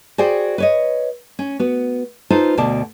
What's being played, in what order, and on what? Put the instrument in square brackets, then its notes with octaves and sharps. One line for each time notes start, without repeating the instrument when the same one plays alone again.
[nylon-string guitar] F#4 G#4 C5 D5 G5
B4 C#5 D#5
C#4
B3 F#4
D#4 F4 A4 B4 C5
D2 B2 D5 A5